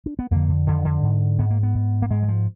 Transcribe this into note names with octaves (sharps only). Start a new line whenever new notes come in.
D4
B3
F2 D3 A#3
D3
F2 D3 D#3
D3
G#2
G#2 B3
A#3
B3
G#2
A#3
G#2 G#3
F#3
F3